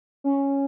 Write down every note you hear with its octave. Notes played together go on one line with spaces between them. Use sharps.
C#4